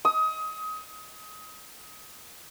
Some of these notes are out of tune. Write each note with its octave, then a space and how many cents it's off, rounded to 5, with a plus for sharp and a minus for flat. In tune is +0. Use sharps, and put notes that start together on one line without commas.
D#6 +25